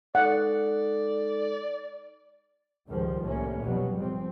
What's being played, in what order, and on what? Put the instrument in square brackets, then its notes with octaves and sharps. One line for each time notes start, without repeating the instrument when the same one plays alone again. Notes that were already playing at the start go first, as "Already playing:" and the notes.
[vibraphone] G#3 D#4 A4 [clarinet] D5 [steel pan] F#5
[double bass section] C#2 G#2 D#3 F3 G3
C2 A2 A#3 C#4
F1 B2 F#3 G3
G#2 F3 C4